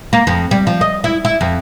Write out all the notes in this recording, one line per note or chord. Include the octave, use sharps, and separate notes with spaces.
A#3
F2
G3
F3
D#5
E4
E4
F2